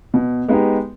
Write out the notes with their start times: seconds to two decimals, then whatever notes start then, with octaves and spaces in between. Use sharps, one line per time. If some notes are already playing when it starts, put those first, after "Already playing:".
0.14 B2
0.48 G#3 B3 D#4 G4